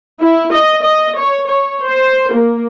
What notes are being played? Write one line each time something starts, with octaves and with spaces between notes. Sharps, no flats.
E4
D#5
D#5
C#5
C#5
C5
A#3